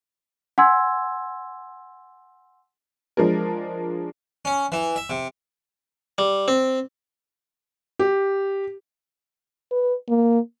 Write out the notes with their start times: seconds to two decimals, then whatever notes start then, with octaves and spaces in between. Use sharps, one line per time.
0.58 F#5 G#5 C6 E6 G#6
3.17 F3 G#3 D4 A#4
4.45 C#4
4.72 E3
4.96 E5
5.10 C3
6.18 G3
6.48 C4
7.99 G4
9.71 B4
10.08 A#3